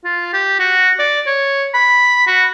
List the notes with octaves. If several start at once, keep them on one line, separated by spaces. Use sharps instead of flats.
F4
G4
F#4
D5
C#5
B5
F#4